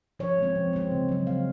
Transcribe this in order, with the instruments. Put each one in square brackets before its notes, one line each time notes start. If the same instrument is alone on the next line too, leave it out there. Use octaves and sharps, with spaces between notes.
[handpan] F3 C#5
G#3 C4
F3
G#3 C4
C#3
F#3 C4
C#3 F5